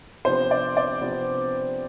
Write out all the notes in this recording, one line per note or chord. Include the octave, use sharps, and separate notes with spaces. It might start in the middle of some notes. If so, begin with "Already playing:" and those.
C3 F3 B3 D4 C5
D5
D5
C3 F3 B3 D4